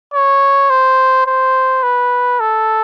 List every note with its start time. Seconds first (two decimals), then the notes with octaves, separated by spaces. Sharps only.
0.14 C#5
0.70 C5
1.27 C5
1.83 B4
2.40 A4